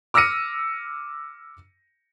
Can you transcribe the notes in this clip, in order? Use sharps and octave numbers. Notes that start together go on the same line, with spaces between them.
D6 E6 F6 A#6 C#7 D#7